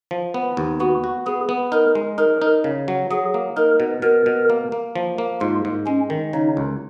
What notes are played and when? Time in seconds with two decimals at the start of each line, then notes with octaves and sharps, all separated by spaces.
0.11 F3
0.34 B3
0.57 D#2
0.80 B3 F#4
1.04 F#4
1.27 B3 G#4
1.49 B3
1.72 D#4 A#4
1.95 G#3
2.18 D#4 A#4
2.42 D#4
2.64 C#3
2.88 F#3
3.11 F#3 G#4
3.34 A#3
3.57 D#4 A#4
3.80 B2
4.02 B2 A#4
4.26 B2
4.50 A#3
4.72 A#3
4.96 F3
5.18 A#3
5.41 G#2 F4
5.65 G#2
5.87 G#3 C#4
6.10 D#3
6.33 C#3 D#4
6.57 C#2